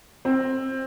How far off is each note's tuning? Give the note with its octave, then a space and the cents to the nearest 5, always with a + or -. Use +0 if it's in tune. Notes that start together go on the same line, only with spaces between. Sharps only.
C4 +15